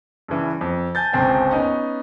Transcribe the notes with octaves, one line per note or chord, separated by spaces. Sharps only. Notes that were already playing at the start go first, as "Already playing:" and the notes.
G2 C#3 E3
F2
G#5 A5 G6 A6
G1 C#2 C4 C5 G5 G#5
B3 C#4 D#4